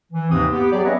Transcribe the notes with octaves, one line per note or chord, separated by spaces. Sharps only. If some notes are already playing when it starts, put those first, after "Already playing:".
E3
D#2 G#2 C3 C4 B4 D#6
B3 G4
F#3 G4 G#4 D5
B3 C#4 B4 C#5 D#5 E5